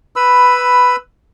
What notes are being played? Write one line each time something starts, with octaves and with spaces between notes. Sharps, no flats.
B4 B5 E6